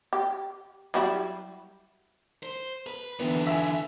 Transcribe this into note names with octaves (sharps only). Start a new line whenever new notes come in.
G4
F#3 G3 E4
C5
B4
D3 E3 B3
E5 G#5